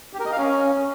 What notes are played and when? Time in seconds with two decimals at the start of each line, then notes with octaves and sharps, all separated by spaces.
0.13 G4
0.19 A#4
0.26 D#5
0.32 F5
0.38 C#4